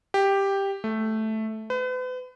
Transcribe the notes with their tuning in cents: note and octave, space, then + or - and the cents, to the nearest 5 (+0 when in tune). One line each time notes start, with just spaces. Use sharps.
G4 +5
A3 -5
B4 +40